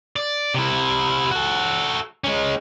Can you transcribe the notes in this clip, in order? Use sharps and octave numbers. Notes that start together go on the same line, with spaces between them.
D5
C3 E4
F#4 A4
G#3 C#4